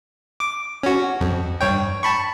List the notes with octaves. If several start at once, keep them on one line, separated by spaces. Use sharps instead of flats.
D6
C#4 F#4
F2
G2 C#5 G5
A5 B5 C#6